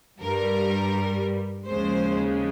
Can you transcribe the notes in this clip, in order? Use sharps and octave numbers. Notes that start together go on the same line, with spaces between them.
G2 G3 A#4
D#2 C#3 F3 G#3 C5